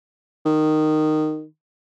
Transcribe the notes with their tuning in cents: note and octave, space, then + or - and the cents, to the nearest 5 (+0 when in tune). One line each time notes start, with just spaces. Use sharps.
D#3 -10